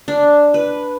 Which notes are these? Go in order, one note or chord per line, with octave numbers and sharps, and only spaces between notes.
D4
B4